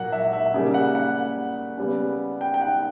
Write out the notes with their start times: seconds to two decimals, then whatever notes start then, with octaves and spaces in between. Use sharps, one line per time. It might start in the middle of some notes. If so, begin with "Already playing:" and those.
Already playing: A#2 F#3 A#3 F#5
0.12 E5
0.33 E5
0.54 C#3 G3 A#3
0.74 F#5
0.95 F#5
1.78 C#3 G3 B3
2.41 G5
2.54 G5
2.61 F#5